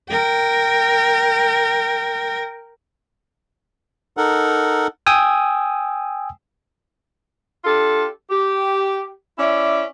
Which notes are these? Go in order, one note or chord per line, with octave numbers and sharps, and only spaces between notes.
A#4 G5
D#4 A4 A#4 F#5
G5 G#5 D#6 E6
D4 F4 G4 A4
G4
C#4 E4 D5 E5